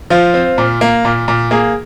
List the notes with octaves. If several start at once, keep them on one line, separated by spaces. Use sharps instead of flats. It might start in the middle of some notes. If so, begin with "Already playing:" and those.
F3 F4
C4
A#2
A#3
A#2
A#2
A#3 G#4